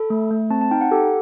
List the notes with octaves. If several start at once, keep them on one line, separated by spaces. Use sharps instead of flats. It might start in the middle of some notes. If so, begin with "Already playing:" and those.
Already playing: A4 B5
A3
A3
C4 A5
A5
D#4 G5
F#5
G4 A4